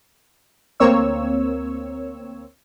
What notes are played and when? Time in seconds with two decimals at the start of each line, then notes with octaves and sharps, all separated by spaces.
0.80 D2 A#3 C4 C#5 E6